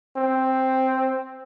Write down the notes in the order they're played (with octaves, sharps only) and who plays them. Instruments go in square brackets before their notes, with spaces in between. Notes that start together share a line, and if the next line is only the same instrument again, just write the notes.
[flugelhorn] C4